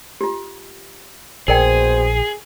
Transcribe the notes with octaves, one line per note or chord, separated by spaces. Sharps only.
F4 G4
A#1 B2 G#4 A#4 C5 D5 G5